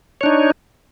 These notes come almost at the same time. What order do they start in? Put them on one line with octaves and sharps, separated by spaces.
C#5 D4 D#4